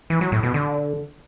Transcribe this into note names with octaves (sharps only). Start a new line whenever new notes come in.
E3
F#3
A2
B2
D3